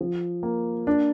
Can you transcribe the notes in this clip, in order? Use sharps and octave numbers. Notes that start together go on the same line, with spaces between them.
F3
A#3
D4